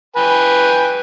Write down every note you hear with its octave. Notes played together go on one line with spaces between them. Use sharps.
B4 G5 G#5